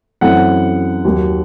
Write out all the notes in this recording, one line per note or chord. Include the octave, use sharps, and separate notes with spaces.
F#2 E3 A3 C4 F#5
D#2 D#3 F#3